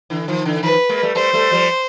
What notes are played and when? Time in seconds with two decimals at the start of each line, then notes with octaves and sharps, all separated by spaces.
0.10 D3 E3
0.28 D#3 F3
0.45 D3 E3
0.63 D#3 F3 B4
0.89 G#3 A#3
1.03 G3 A3
1.15 G3 A3 C5
1.33 G3 A3
1.51 F3 G3